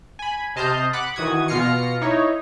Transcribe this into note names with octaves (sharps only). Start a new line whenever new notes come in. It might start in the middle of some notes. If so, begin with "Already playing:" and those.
G#5 B5
C3 D#5 A5 C6 F6 G6
F#5 B5 D6 F#6
D#3 E3 F#4 D#6 G#6
B2 F4 F6 A#6 C7 C#7
D#4 E4 C#5